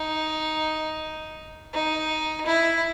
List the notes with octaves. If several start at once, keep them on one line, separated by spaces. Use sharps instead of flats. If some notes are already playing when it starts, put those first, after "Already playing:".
Already playing: D#4
D#4
E4